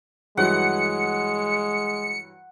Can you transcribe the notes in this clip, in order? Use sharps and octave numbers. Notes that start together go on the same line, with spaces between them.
G2 E3 F#3 G#3 F#5 C#7